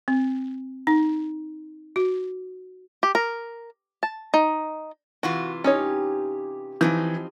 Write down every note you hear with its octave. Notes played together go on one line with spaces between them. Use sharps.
C4
D#4
F#4
G4
A#4
A5
D#4
C3 E3 F4 F#4
C#4 D#4 G4 C#5
E3 F3 C4 D#4